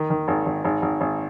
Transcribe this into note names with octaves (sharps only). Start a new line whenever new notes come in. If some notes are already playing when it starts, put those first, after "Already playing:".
Already playing: D#3
D#3
G#1
G#1
G#1
G#1
G#1